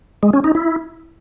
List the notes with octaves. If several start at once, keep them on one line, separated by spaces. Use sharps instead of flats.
G#3
C#4
D#4
E4